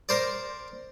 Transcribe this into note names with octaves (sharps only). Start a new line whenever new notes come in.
A#4 C5 D5